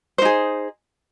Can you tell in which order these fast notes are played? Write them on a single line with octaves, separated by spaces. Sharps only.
C5 D#4 G#4